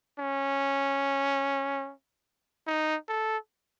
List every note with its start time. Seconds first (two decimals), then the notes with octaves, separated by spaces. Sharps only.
0.19 C#4
2.67 D#4
3.09 A4